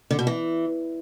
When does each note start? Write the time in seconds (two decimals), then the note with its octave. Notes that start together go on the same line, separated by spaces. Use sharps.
0.11 D3
0.19 B2
0.27 E3